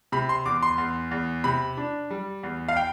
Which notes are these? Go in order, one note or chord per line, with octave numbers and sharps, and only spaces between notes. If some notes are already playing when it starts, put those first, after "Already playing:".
C3 B5
C6
E2 D6
C6
E2
E2
C3 B5
D4
G3
E2
F5
G5